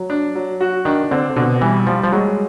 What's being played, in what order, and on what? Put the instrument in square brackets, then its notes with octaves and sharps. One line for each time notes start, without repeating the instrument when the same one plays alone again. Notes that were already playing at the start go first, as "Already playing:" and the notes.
Already playing: [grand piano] F#3
D4
F#3
F#4
[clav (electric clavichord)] D#3 [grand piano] D4
[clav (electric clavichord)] D3 [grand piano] C4
[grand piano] B2 [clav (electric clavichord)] D3
[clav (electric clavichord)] E3 [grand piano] G3
[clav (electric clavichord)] F3 [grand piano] G3
[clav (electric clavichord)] F3
[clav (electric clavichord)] F#3 [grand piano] G#3